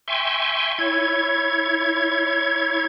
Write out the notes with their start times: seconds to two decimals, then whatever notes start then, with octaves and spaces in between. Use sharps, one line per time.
0.08 E5 G5 G#5 C6 C#6
0.78 E4 C#5 G#6